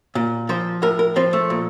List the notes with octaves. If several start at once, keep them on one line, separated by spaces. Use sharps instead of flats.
A#2
F3 C5
A2 A#4
A#4
F3 C4
A3
A#2